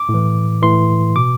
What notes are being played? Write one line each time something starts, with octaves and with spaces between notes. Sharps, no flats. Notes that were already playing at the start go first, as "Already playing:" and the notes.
Already playing: D6
A2
E3
A2 E3 C6
B2 D6